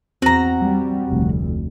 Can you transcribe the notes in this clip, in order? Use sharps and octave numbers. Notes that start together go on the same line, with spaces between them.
E2 C4 F#4 A#5
G3
F1 D2